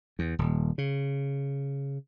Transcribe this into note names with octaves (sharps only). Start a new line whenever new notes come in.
E2
D#1
C#3